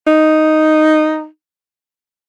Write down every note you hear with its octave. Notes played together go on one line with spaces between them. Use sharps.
D#4